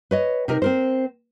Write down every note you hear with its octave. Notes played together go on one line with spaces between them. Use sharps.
B4 C#5 D#5
C3 D#4 A#4
C4 A#4 C5